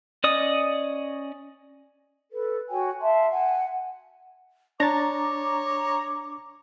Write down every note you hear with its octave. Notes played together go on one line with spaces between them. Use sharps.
C#4 D5 D#5 D#6
A4 B4
F#4 C#5 G5 G#5
E5 F5 A5 C6
F#5 G#5
D4 C#5 A#5 D6 A6